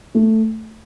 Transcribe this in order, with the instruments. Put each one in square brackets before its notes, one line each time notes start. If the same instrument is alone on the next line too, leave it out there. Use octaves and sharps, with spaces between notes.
[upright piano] A3